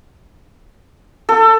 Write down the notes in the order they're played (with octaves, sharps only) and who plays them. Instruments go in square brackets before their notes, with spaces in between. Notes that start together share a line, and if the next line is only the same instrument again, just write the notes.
[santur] A4